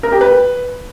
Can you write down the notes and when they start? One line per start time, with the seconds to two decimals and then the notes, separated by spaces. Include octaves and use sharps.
0.03 A#4
0.12 G4
0.21 B4